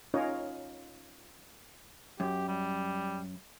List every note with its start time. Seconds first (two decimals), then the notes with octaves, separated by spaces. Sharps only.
0.14 C#4 D#4 F4 A#4 C#5 D#5
2.20 F#2 G4
2.48 G3